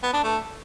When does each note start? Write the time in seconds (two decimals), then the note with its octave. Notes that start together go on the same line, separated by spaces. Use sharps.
0.03 B3
0.13 D4
0.23 A3